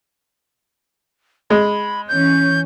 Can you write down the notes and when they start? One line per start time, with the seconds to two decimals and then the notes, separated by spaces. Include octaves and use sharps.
1.50 G#3 B5
2.09 E3 C#4 G6